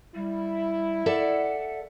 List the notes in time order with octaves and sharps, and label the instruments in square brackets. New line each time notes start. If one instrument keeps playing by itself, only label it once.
[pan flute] G3 [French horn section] E4
[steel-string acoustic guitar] A4 D5 E5 [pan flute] F#5